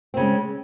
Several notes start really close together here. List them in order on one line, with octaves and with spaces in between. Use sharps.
C4 C#3 G#3